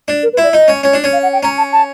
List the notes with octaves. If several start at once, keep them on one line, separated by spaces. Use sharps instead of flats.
D4
A#4
B4
E4
D5
D#4 D#5
C#4
C#4
D4
C#4
F5
F#5
G5
C#4 A#5
A5
A5